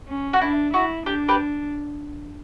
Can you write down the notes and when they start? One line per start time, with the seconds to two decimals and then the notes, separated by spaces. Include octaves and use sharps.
0.09 C#4
0.33 F#4
0.41 D4 E4
0.73 E4 F#4
1.06 D4 G4
1.28 G4 B4